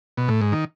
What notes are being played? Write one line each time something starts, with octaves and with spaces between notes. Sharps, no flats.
B2
A2
G#2
D#3